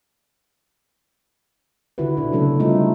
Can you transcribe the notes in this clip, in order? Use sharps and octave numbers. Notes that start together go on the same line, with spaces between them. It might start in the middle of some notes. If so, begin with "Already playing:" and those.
D3 D#3 E4 F#4 B4
B2 D4
C#3 F#3 A3 A#3 A4
G3 A3 C4 D#4 F4